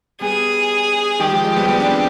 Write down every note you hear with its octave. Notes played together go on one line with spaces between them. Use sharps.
G3 B3 G#4
D#3 G3 G4
F3 G#3
F3 G#3
G3 B3
G3 B3
D4
G#3 C4